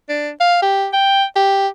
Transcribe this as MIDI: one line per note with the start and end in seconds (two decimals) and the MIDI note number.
0.09 0.31 62
0.41 0.58 77
0.62 0.88 67
0.93 1.24 79
1.36 1.67 67